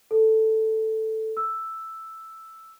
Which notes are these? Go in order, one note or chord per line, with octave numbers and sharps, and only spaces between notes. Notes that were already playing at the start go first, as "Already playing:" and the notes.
A4
E6